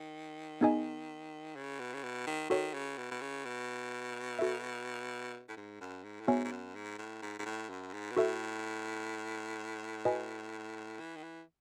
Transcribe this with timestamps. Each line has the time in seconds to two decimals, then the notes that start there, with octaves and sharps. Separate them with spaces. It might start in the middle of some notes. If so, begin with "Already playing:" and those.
Already playing: D#3
0.61 B3 D#4 G#4 D#5 G#5
1.56 C#3
1.80 B2
1.94 C#3
2.03 B2
2.27 D#3
2.50 D#3 F#4 A4 C#5
2.74 C#3
2.98 B2
3.11 B2
3.21 C#3
3.45 B2
4.39 F#4 A4 E5
5.49 A2
5.57 G#2
5.81 F#2
6.04 G#2
6.20 A2
6.28 G#2 B3 F#4 C#5 E5 G#5
6.45 G#2
6.52 F#2
6.75 G#2
6.99 A2
7.22 G#2
7.39 G#2
7.46 A2
7.69 F#2
7.93 G#2
8.12 B2
8.16 A2 F#4 A4 E5
10.05 F#4 B4 D#5 G#5
11.00 E3
11.16 D#3
11.23 E3